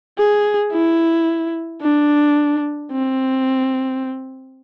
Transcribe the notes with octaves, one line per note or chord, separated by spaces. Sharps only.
G#4
E4
D4
C4